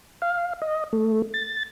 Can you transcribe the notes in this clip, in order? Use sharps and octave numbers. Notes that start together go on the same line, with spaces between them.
F5
D#5
A3
A6